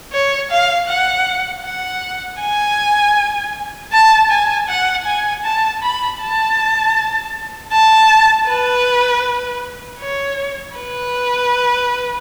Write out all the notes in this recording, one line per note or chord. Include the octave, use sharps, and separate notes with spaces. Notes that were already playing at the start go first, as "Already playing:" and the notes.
C#5
F5
F#5
F#5
G#5
A5
G#5
F#5
G#5
A5
B5
A5
A5
B4
C#5
B4